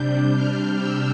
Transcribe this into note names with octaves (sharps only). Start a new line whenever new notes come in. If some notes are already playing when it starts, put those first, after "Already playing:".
Already playing: C3 G3 D4 G6
F6
E6